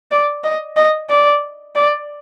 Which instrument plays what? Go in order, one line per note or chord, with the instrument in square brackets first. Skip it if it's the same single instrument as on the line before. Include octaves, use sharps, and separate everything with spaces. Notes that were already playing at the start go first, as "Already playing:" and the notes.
[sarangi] D5
D#5
D#5
D5
D5